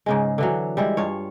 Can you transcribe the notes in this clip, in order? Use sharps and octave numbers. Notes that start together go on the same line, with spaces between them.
G#2 C#3 G#3
D3 E3 F#3
G3 G#3 E4
G2 F4 C#5